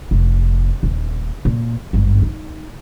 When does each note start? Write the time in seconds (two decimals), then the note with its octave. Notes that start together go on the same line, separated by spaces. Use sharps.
0.11 F1
0.83 D#1
1.45 A#2
1.93 G#1 G2
2.22 D#4